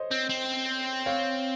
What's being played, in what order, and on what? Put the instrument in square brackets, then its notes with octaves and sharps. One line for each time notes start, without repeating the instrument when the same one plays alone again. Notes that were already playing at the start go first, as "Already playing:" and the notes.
Already playing: [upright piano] C5 C#5 D#5
[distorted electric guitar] C4
C4
[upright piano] C#5 F5